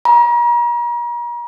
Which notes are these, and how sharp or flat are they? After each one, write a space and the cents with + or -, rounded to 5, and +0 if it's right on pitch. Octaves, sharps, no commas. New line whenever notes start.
A#5 +40